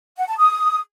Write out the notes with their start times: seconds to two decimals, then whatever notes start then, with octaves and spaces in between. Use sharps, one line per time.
0.17 F#5
0.28 A5
0.38 D#6